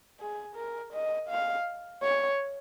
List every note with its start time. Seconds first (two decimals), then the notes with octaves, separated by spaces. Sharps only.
0.20 G#4
0.56 A#4
0.93 D#5
1.29 F5
2.03 C#5